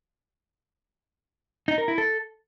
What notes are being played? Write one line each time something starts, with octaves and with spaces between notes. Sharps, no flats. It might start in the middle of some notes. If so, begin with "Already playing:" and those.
D#4
A#4
E4
A4